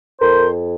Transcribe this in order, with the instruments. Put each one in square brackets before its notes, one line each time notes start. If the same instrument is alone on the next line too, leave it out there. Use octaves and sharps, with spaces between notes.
[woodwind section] F2 A#4 C5